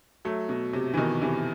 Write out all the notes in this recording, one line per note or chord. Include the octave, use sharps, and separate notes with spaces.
F#3 A3
B2
C3
E3
B2 D#3
C3 E3